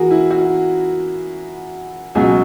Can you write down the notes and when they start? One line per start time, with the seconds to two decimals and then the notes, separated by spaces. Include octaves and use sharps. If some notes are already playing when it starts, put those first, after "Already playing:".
Already playing: E3 F#4 G#4 A#4
0.11 E4
0.31 F#4
2.15 C#2 B2 F#3 G#4